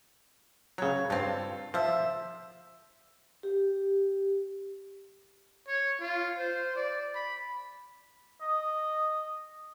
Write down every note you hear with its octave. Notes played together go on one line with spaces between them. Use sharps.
C#3 F#3 C#5
G2 C4 F4 A4
F3 C5 E5
G4
C#5
F4
C5
D5
B5
D#5